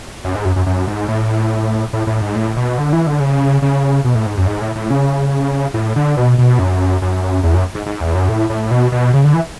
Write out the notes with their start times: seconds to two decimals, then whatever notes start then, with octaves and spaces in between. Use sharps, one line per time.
0.25 F#2
0.35 G#2
0.45 F#2
0.56 F#2
0.66 F#2
0.87 G#2
1.08 A2
1.93 A2
2.07 A2
2.21 G#2
2.35 A2
2.56 B2
2.78 D3
2.93 E3
3.07 D3
3.20 C#3
3.62 C#3
4.05 B2
4.15 A2
4.26 G#2
4.37 F#2
4.47 G#2
4.61 A2
4.76 A2
4.90 C#3
5.74 A2
5.96 D3
6.17 B2
6.39 B2
6.59 F#2
7.02 F#2
7.43 E2
7.54 F#2
7.75 G#2
7.86 G#2
8.01 E2
8.15 F#2
8.29 A2
8.50 A2
8.71 B2
8.92 B2
9.14 C#3
9.24 D3
9.34 E3